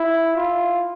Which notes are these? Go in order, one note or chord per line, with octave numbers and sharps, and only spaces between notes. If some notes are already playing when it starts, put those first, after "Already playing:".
Already playing: E4
F4